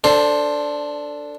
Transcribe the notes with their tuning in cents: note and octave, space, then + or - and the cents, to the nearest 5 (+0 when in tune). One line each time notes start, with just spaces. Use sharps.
D4 -5 A4 +25 C5 +5